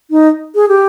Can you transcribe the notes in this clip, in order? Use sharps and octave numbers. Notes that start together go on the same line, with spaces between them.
D#4
G#4
G4